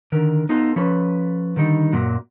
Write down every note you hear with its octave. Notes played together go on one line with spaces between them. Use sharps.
D3 D#3 A#4
B3 D#4 F4 A4
F3 C#4 A4 B4
D3 D#3 G3 D#4
F#2 A#2 F#3